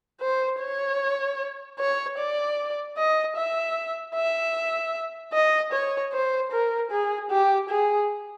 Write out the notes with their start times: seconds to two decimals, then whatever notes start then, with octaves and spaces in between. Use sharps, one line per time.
0.21 C5
0.60 C#5
1.79 C#5
2.18 D5
2.97 D#5
3.36 E5
4.15 E5
5.33 D#5
5.72 C#5
6.12 C5
6.52 A#4
6.91 G#4
7.30 G4
7.70 G#4